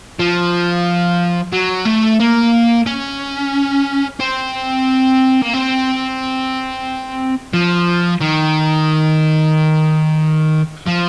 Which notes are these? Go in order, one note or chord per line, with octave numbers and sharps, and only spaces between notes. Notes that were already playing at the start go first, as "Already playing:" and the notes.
F3
F#3
A3
A#3
C#4
C4
A#3
C4
F3
D#3
F3